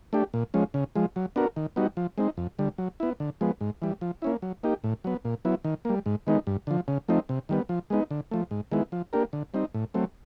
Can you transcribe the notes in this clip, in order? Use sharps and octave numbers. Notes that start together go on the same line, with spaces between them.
A3 D4 G4
A#2
F3 G#3 C#4
C#3
F3 G#3
F#3
B3 D4 F#4 A#4
D#3
G3 B3 D#4 F#4
F3
G#3 C4 D#4
F2
D3 G3
F#3
B3 E4
D3
F3 G#3 B3
G#2
E3 G3
F3
A#3 C#4 E4
F#3
A#3 D#4 G4
A2
F#3 B3
A#2
F#3 B3 E4
D#3
G3 A#3
G#2
D#3 G#3 B3 D#4
G2
D3 F3
C#3
F3 A3 C4 D#4
C3
D#3 G3 B3
F3
G#3 B3 D#4
D3
F3 A3
G#2
D#3 G#3 B3 E4
F3
A#3 D4 G4 A#4
D3
G3 C4 D#4
A2
F#3 A3 C4